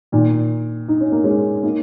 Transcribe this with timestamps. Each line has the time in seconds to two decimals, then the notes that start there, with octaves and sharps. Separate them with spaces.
0.12 A#2 D#3
0.88 D#4
1.01 C#4
1.12 A#3
1.24 G#3 C#4
1.63 A#3 D#4